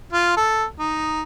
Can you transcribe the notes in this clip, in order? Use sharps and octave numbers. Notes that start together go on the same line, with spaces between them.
F4
A4
D#4